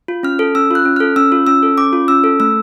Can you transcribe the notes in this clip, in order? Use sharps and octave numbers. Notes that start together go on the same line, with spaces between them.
F4
C#4 F6
A4
C#4 E6
F4 F#6
C#4
A4 F6
C#4 E6
F4
C#4 E6
A4
C#4 D6
F4
C#4 E6
A4
A3 E6